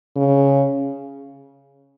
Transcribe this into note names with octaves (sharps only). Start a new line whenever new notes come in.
C#3